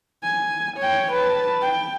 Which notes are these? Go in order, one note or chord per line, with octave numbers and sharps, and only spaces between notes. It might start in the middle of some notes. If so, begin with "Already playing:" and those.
G#5
C#5 G5
B4 A5
G5